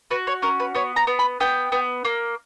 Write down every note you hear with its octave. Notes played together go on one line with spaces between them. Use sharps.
F#4 B4
C#5
C#4 A#4
B4
B3 C#5
A#5
B3
B5
B3 G5
B3
A#3